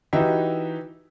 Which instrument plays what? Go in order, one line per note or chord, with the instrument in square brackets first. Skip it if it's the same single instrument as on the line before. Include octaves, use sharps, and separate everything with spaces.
[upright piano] E3 D#4 F#4 G4 E5